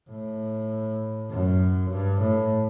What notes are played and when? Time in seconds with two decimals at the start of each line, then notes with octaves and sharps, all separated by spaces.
0.10 A2
1.31 F#2
1.91 G2
2.21 A2